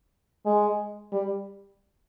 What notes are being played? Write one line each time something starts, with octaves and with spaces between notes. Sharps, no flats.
G#3
G3